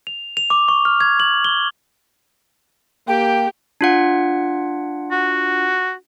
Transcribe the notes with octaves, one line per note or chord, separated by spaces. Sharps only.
F7
F7
D6
C#6
F6
G#6
F#7
G7
A#3 G4 G5
D4 F4 F#5
F#4